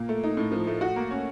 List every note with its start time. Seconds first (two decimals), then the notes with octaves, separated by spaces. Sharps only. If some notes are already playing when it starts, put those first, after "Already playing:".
Already playing: A#2 A#3
0.09 A3
0.23 D#4
0.37 A2
0.52 F3
0.67 A3
0.81 F#4
0.96 A#3
1.11 C#4